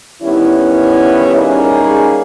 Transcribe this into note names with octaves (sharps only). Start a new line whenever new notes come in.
D#3 G3 B3 C#4 E4
G3 A#3 C#4 D#4 G#4